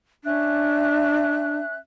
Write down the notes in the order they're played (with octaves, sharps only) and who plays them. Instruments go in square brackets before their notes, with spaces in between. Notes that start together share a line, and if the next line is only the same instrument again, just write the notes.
[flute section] C#4 E5 F#6 [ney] D4